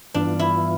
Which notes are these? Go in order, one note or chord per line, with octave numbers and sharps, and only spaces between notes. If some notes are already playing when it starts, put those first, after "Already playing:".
G2 E3 B3 D4 F4
E4